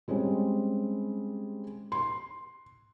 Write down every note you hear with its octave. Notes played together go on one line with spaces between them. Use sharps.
G3 G#3 C4 C#4
C6